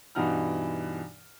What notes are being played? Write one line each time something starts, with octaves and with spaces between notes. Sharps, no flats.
G2 B2 E3 D#4 F#5 F6